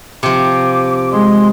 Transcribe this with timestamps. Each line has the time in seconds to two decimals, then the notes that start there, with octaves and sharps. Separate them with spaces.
0.23 C3 F3 D6
1.12 G#3 C6